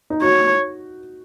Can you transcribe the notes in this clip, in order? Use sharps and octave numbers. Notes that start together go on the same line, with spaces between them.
D#4
F#4 C#5